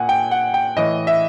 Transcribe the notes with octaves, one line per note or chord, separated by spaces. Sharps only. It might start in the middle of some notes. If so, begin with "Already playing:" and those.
Already playing: A#2 F#5 G#5
G5
F#5
G5
A2 E3 D#5
E5